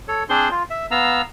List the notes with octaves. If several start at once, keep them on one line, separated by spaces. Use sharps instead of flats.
A4 C#5
C4 D4 G#4 C5 C6
F4
E5
B3 F5 A#5 E6